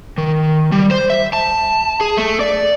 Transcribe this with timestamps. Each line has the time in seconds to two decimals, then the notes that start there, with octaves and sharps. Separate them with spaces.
0.18 D#3
0.72 G3
0.91 C5
1.10 E5
1.33 A5
2.01 G#4
2.17 A3
2.40 D5